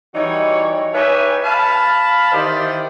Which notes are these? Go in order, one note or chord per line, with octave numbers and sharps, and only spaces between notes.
E3 G3 D#4 F#4 C#5
D#4 G4 B4 C#5 E5 G#5
F5 A5 B5
D#3 E3 G4 C5 D5 D#5